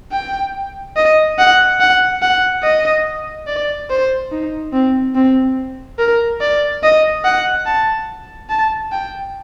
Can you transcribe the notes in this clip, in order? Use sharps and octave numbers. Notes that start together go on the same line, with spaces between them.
G5
D#5
F#5
F#5
F#5
D#5
D5
C5
D#4
C4
C4
A#4
D5
D#5
F#5
A5
A5
G5